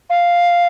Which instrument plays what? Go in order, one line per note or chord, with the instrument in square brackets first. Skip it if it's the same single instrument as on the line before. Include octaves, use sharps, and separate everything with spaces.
[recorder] F5